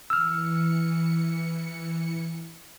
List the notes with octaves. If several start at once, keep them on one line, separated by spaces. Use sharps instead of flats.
E3 E6 F6 C#7